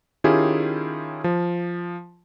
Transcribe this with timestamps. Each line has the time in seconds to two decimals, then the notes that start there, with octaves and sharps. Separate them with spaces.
0.24 D#3 C#4 E4 F4 G4 G#4
1.24 F3